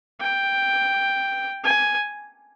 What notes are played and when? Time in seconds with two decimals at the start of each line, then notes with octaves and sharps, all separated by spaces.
0.20 G5
1.64 G#5